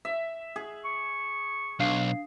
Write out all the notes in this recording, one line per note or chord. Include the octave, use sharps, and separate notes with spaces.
E5
G#4
C#6
B1 D4 F5 C7